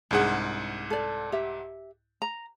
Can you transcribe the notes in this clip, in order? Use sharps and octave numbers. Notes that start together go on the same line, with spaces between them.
C2 G#2 D4 G#4 F#5
A4 D5
G4 E5
A#5